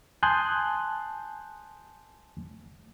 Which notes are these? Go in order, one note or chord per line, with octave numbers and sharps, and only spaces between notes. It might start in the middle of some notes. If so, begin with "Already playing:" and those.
G#5 A5 C6 D#6 F#6 G6